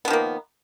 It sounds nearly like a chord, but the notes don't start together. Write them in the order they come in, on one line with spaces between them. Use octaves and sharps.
B3 F3 D#3 A#3